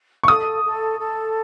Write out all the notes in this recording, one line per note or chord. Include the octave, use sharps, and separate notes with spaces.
C#6
A4 D#6
A4
A4